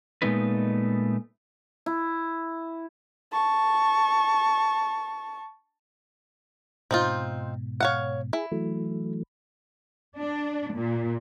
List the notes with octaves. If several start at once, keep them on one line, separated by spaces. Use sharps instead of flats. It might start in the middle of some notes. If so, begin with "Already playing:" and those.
A#2 G#3 A3 B3 D#4 B4
E4
A5 C#6
G#2 B2 C4 D#4 F4
C#5 F5 F#5
E4 G#4
E3 F#3 A3
D4
A#2